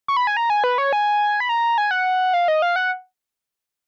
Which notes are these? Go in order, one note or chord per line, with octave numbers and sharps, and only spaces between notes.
C#6
B5
G#5
A#5
G#5
B4
C#5
G#5
B5
A#5
G#5
F#5
F5
D#5
F5
F#5